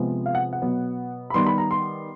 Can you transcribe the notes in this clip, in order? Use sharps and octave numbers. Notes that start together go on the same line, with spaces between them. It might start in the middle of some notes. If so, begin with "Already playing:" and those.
Already playing: C3 F3 G#3 B3
F5
F#5
F#5
B2 F#3 B3
B5
D#3 G3 B3 C6
B5
A#5
C6